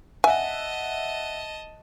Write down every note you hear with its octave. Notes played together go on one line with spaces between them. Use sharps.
D#5 E5 F#5 G#5 A5